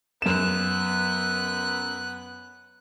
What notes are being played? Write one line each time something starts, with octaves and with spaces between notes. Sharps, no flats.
F#2 B3 F#6 E7